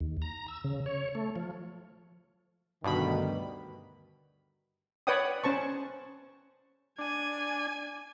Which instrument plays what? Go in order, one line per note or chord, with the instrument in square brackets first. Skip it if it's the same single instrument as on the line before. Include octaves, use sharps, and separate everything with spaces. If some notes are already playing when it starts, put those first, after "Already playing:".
[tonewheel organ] D#2
A#5
E6
C#3
C#5
A3
F3
[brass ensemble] D2 D3 D#3 [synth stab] G2 B2 B5
[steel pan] B4 C#5 D5 F#5 G5 D#6
C#4 C5 A5 C#6
[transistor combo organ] D4 [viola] G#5